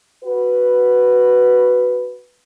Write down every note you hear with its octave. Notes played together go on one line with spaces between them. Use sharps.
F#4 B4